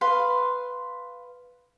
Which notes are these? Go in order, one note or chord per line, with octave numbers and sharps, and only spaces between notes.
B4 F5 C6